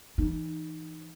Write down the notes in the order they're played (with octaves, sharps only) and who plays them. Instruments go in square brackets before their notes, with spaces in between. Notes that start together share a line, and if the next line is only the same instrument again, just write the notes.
[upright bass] E3 D#4